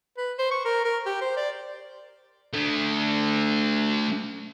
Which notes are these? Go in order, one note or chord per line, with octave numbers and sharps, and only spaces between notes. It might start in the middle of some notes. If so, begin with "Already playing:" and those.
B4
C5
C#6
A#4
A#4
G4
C5
D5
A3 D4